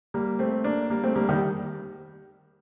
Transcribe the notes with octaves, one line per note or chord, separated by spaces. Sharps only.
G3 A#3
A3 C4
A#3 D4
G3 A#3
A3 C4
G3 A#3
D#3 G3